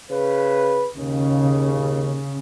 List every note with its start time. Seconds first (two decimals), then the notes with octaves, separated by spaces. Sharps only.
0.11 C#3 B4
0.95 D#2 C#3